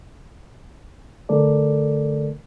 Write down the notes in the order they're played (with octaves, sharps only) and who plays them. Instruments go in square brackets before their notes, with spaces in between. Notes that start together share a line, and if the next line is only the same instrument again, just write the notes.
[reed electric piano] D3 A3 A4 A#4 D5